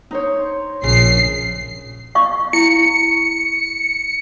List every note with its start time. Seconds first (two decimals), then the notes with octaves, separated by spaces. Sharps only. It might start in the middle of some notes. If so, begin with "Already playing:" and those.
0.11 D#4 C5 C#5
0.84 A#1 C#3 C7
2.15 F5 C#6
2.53 E4 C#7